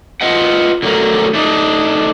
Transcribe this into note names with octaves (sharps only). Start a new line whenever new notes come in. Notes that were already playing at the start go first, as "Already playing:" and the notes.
F4 B4 D#5 F#5
D3 F#3 A3 A#4
A3 D4 D#4